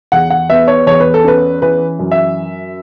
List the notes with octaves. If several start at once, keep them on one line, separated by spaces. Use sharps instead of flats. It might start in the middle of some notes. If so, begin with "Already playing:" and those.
E2 F#5
F#5
B3 E5
C#5
E2 C#5
B4
A4
C#4 B4
E3 B4
F#2
E5